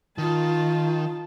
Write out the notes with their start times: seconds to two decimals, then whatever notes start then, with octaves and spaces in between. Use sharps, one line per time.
0.18 D#3 F4 A5